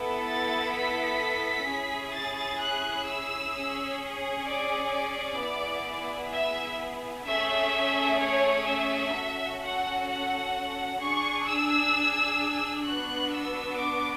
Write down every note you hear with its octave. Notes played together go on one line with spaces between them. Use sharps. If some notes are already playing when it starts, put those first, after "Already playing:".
Already playing: B3 E4 A4
A6
B6
C#4 E4 G#4
A6
F#6
E6
C#4 G#4
D5
D5
B3 E4 G#4
E5
A3 C#4 G#4 E5
C#5
E5
C#4 F#4 A4
F#5
F#5
D4 G#4 C#6
E6
B3 D4 F#4 F#6
E6
D6